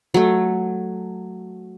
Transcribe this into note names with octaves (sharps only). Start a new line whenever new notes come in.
F#3 A3